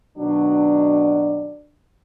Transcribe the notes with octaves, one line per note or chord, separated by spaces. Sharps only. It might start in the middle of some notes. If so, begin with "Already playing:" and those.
B2 D#3 F#3 D4